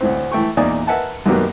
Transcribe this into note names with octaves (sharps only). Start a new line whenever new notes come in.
D2 A2 C4
E3 A3 G5 C#6
E2 A#2 D#4 D5 G#5 D#6
A#4 B4 E5 F#5 G#5 A5
F#2 D#3 G3 A#3 B3 F#4